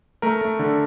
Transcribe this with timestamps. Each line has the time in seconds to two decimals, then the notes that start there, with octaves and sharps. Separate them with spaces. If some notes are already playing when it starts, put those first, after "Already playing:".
0.22 A3 A#4
0.41 A3
0.59 D3